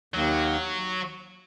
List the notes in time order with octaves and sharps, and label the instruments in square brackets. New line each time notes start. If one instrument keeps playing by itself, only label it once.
[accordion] D#2 D#3 A#3 [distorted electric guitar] F#3